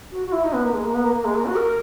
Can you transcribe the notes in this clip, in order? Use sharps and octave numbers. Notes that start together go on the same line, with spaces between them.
F#4
F#4
E4
D#4
B3
A#3
G#3
A#3
B3
A#3
A#3
G#3
A#3
F#4
A#4